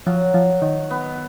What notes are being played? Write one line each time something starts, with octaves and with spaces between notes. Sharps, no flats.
F3 F#3
F3
D#3
B3